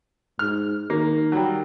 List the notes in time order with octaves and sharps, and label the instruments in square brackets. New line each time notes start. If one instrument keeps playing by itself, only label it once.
[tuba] G#2 [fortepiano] F6
[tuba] D#3 [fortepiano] A#3
[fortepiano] F#3 G3